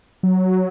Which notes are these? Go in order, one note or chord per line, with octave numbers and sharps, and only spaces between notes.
F#3